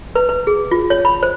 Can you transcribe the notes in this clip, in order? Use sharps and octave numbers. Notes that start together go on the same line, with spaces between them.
B4
B4
G#4
F4
C#5
B5
C5